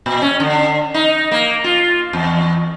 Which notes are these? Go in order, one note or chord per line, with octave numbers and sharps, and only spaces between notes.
A#2
C#4
D3
D#4
A#3
F4
E2